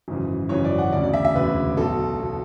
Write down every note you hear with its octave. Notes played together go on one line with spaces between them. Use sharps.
G#1 F#2 C#3 E3
G#1 F#2 C#3 E3 C#5
D5
F#5
E1 D2 C#3 D5
D5
E5
E5
E1 D2 C#3 B4
B1 B2 A4
B2